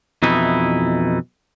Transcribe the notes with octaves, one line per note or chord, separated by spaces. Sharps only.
F2 B2 E3 D#4 E4